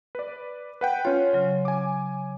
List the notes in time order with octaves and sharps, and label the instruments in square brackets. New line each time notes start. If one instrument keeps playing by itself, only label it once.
[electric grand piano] B4 D5
B4 F#5 G5
[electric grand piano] C#4 F4 [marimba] C#5
[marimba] C#3 F#3
[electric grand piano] G#5 D6